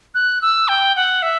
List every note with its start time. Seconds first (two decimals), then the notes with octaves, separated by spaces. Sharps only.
0.15 F#6
0.42 E6
0.68 G5
0.96 F#5
1.22 E5